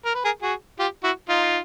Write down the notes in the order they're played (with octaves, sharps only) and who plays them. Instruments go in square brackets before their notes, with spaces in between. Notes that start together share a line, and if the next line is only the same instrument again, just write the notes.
[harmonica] A#4
B4
G#4 A#4
F#4 G#4
F4 G4
E4 F#4
D#4 F4